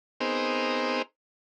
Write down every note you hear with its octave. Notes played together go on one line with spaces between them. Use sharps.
B3 C4 D#4 G#4 A#4 C5